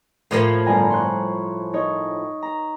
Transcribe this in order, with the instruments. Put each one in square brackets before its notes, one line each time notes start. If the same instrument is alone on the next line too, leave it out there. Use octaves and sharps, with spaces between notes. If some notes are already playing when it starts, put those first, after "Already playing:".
[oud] A2 F3 A#3 [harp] C6 G#6 D#7
[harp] G1 G#5 A#5
C6 C#6 F#6
D#4 C#5
A#5